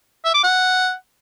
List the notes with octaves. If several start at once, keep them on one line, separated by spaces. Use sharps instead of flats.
E5
D6
F#5